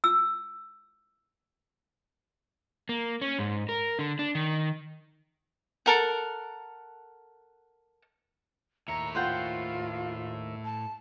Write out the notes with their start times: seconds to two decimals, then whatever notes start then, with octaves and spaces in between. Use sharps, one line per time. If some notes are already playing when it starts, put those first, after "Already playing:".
0.04 E6
2.89 A#3
3.21 C#4
3.39 G#2
3.69 A#4
3.99 D3
4.19 D4
4.35 D#3
5.86 A4 A#4 F#5
8.88 D#2 A2 C#5 E5 A#5
9.15 F4 C5 F#5 G5
10.65 A5